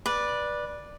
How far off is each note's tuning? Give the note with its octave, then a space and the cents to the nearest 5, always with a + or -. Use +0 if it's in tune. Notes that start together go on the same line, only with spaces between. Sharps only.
B4 -15 D5 +5